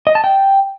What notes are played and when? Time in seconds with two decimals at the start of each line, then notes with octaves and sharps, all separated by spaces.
0.07 D#5
0.15 A5
0.24 G5